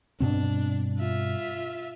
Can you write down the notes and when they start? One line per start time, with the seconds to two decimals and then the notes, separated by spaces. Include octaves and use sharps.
0.20 G2 B2 C4 D4
0.99 F4 E5